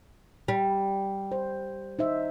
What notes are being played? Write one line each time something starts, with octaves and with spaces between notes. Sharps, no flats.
G3
C5
D#4 C5 E5